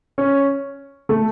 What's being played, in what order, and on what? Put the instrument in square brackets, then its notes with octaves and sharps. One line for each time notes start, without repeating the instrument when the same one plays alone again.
[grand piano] C#4
A3